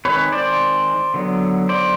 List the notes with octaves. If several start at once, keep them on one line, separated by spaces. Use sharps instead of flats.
D#3 G#3 C4 B4 C#5
C5 D5
D3 F#3 B3
C5 D5